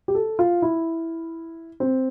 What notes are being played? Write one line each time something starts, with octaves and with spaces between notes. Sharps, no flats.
G4
A4
F4
E4
C4